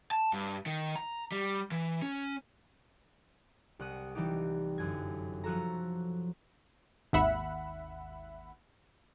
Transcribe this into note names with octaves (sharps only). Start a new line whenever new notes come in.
A5
G2
D#3
A#5
G3
E3
C#4
C2 F#5 D#6
E3 G3 D#4 G4
G1 F#2 G#6
F3 F#3 F#4 A4 A#5
G#1 D#2 E5 F#5 B5